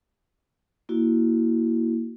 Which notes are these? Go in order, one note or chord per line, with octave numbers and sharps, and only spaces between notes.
A#3 E4 F#4